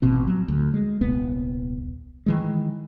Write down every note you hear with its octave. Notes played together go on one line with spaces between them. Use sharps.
A1 B2 C4
F#3
D2
G#3
D#1 C2 B3
D#3 E3 G#3